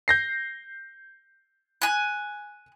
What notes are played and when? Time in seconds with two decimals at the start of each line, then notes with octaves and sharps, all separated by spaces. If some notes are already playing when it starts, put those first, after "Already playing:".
0.08 G6 A#6 C7
1.82 G#5 F#6